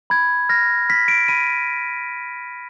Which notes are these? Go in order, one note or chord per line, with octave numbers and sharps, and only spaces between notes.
B5 G#6
F6 A#6
F6 B6
D7
B5 D#7